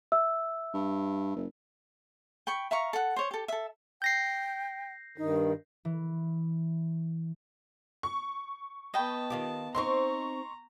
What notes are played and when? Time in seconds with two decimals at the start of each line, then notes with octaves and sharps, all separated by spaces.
0.12 E5 E6
0.74 G2
1.36 F#1
2.47 G5 B5 C#6
2.71 E5 F5 A#5 C#6
2.93 A4 F#5
3.16 C5 C#5 C#6
3.31 G4 A4
3.48 A4 E5
4.02 G5 G6 A#6 C7
5.18 G2 D#3 D#4
5.85 E3
8.03 C#6
8.94 B3 D#5 G5 A5 B5
9.30 D#3 F4 G4
9.75 C4 D#4 C5 A#5 C6 C#6